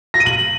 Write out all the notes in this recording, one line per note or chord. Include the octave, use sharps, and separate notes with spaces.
A#6
D#7
F#7